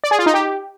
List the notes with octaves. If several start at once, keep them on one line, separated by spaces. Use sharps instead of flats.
D5
G#4
F4
D#4
G4